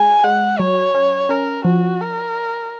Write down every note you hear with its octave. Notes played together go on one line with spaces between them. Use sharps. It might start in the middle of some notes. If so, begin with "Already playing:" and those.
Already playing: G#3 G#5
G#3 F#5
F#3 C#5
C#4
C#4 A#4
F3 F#4
A#4